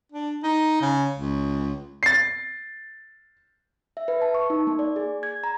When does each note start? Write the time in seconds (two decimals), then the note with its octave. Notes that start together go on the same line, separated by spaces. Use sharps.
0.12 D4
0.43 D#4
0.82 C#3
1.18 C#2
2.03 A6 C7
3.97 E5
4.08 B4
4.22 A5
4.35 C#6
4.50 D#4
4.67 A#3
4.79 D5
4.96 G#4
5.23 G#6
5.44 A#5